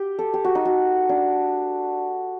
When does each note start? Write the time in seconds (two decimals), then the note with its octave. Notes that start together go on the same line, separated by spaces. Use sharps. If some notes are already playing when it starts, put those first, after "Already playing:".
Already playing: G4
0.19 A4
0.34 G4
0.44 F#4
0.55 D#4
0.65 F#4
1.09 D4